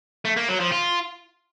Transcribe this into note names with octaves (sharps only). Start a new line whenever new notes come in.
A3
A#3
F#3
F3
F4